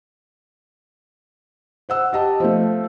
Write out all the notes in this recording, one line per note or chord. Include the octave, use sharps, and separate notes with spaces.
C5 F#5 E6
G4 D#5 A5
F3 A3